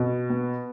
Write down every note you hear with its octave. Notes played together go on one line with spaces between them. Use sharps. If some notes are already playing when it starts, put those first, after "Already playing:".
Already playing: B2
B3